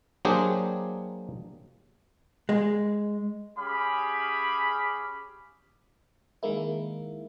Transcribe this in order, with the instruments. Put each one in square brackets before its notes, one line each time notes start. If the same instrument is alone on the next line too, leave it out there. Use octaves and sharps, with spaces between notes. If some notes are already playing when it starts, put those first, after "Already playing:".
[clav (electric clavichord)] F#3 A#3 D4 G4 G#4 C5
[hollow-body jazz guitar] G#3
[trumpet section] C#4 G4 G#4 F5 B5
[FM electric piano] D#3 G#3 A#3 E4